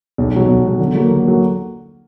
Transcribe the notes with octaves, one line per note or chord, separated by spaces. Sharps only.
B1
B2 F#3
B1
B2 F#3
D3
F#3 A#3
D3
F#3 A#3